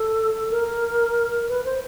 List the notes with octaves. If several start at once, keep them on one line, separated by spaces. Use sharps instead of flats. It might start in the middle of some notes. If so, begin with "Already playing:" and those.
Already playing: A4
A#4
B4
C5